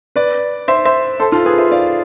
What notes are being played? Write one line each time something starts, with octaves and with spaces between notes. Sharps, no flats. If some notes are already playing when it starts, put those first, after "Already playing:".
B4 D5
C5 E5
C5 E5
A4 C5
F4 A4
G#4 B4
C5 E5
D5 F5